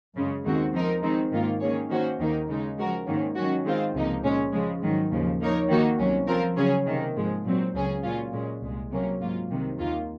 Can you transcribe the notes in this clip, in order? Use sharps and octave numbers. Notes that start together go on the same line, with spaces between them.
F#2 C#3 G#3
D#2 D#3 G#3 C4 F#4
F3 C4 D#4 A#4
D#3 G#3 C4 D#4
G#2 D#3 A#3 F4
D#3 A#3 C#4 G#4 C#5
D#3 A#3 C#4 F#4 C5
D#2 D#3 A#3 D#4 A#4
C#3 G#3 D#4
F3 G#3 C#4 F#4 A#4
G#2 D#3 A#3 C#4
D#3 F#3 C#4 F#4
D#3 G#3 C4 F4 C5
C#2 C3 F3 A#3 D#4
A#2 G#3 C#4
C#3 F3 G#3
G#2 D#3 F#3
D#2 C#3 F3
F3 A#3 D#4 A#4 C#5
D#3 A#3 D#4 F#4
C2 C3 F#3 C#4
F3 C4 F4 A#4
C#3 F#3 C#4 G#4 C#5
C3 D#3 A#3
G#2 F3 G#3
A#2 F#3 C4
C#2 C#3 F#3 C#4 G#4
A#2 F#3 C#4 F4
A#2 G#3 C#4
C2 A#2 G#3
C3 F#3 A#3 C#4
G#2 F#3 A#3 F4
C2 C3 D#3
D#2 D#3 A#3 F4